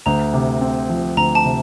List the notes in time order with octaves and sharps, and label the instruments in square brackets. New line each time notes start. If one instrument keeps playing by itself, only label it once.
[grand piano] D2 [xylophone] A#5
[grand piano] C3
C4
F3
[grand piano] D2 [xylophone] A#5
[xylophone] A5
[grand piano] C3